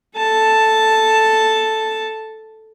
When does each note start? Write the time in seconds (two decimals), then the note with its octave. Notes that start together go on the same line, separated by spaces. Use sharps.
0.17 A4 A5